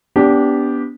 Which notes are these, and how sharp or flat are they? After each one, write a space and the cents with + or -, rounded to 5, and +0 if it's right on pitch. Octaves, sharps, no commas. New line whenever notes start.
B3 +0 D4 -25 G4 +0